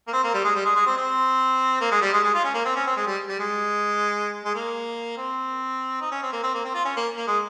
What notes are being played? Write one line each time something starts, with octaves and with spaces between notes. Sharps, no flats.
A#3
C4
A#3
G3
G#3
G3
G#3
G#3
C4
C4
A#3
G#3
G3
G#3
G#3
F4
C#4
A#3
C4
C#4
C4
G#3
G3
G3
G#3
G#3
A#3
C4
D#4
C#4
C4
A#3
C4
A#3
C4
F4
C#4
A#3
A#3
G#3